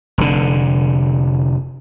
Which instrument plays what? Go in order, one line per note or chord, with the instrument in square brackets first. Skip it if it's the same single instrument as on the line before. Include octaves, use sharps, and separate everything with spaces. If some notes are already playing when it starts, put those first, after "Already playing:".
[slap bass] F1 D3